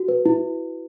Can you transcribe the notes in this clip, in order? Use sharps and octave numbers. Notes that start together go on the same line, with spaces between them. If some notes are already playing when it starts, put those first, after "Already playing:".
Already playing: F#4
B4
E4